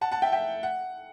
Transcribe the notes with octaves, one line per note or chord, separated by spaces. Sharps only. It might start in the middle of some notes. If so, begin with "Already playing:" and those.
F#5 A5
F#5 A5
E5 G5
E5 G5
F#5